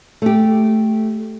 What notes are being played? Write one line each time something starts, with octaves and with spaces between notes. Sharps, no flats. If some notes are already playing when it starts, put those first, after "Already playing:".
A3 G4